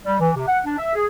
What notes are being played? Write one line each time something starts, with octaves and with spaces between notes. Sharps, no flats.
G3
E3
C3
F#5
D4
E5
G#4